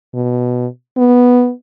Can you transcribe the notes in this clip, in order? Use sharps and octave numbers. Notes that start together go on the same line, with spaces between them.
B2
B3